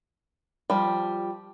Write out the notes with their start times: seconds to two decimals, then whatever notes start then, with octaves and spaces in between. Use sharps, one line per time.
0.70 F3 G3